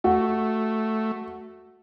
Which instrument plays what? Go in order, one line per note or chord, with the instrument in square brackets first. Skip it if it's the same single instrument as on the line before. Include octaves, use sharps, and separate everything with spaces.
[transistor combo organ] A3 [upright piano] F#4